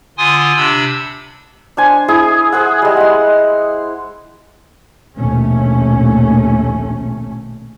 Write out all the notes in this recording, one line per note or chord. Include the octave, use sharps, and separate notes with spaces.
D3 F4 G#5 C6 D#6
C3 D4 B5 E6
D4 C5 G#5
E4 G#4 D#6
G#4 C5 F#5
G3 G#3
F#5 C6
A#1 D#2 B2 A3 C#4